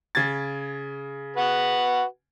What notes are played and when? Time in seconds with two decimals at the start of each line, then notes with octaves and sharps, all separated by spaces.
0.15 C#3 G#6 A6
1.37 F#4 B4 F#5